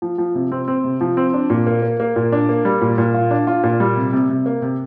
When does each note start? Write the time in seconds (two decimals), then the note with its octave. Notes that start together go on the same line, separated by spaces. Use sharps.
0.02 F3
0.18 F3
0.35 C3
0.52 C4
0.68 C4
0.84 C3
1.01 F3
1.17 C4
1.34 D4
1.50 A#2
1.67 A#3
1.82 A#3
2.00 A#3
2.16 A#2
2.32 D4
2.49 A#3
2.65 G3
2.81 A#2
2.98 A#2
3.14 F4
3.31 D4
3.47 F4
3.64 A#2
3.80 G3
3.96 C3
4.13 C3
4.30 C3
4.46 A#3
4.62 C3